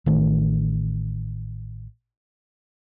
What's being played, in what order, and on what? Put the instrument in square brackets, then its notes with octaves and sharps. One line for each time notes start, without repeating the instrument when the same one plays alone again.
[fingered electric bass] A1 D#3 A3